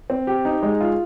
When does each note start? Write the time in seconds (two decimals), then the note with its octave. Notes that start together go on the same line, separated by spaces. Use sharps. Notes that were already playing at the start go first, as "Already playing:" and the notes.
0.10 C4
0.27 G4
0.45 D#4
0.63 G#3
0.81 F4